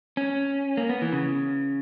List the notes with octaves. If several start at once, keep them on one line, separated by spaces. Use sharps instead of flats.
C#4
A#3
B3
E3
C#3